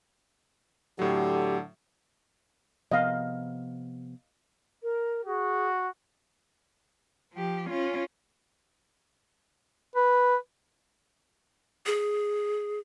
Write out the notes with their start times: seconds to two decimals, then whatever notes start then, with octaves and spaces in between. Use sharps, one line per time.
0.99 A2 D3 F#3 G4
2.91 C3 F3 B3 D#5 F5
4.82 A#4
5.25 F#4 G#4
7.33 F3 G4
7.70 C#4 F4
9.96 B4
11.86 G#4